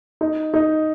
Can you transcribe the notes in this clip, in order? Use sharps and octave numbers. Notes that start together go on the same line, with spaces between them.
D#4
D#4